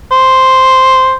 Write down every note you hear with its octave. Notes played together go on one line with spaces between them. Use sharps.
C5